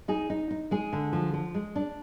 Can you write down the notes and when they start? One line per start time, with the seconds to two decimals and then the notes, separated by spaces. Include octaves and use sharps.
0.08 D#4 G#4
0.30 D#4
0.51 D#4
0.71 G#3 G#4
0.93 D3
1.13 F3
1.34 F3
1.54 G#3
1.76 D4